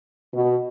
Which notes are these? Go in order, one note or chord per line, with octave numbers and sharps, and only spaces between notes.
B2